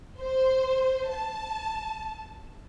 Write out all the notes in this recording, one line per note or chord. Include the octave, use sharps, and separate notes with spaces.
C5
A5